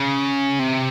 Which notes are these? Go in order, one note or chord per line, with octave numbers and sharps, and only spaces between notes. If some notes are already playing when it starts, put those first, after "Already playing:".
Already playing: C#3
C3